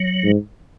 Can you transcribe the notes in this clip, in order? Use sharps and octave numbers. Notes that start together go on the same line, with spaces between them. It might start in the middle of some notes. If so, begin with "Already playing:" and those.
Already playing: F#3
G#2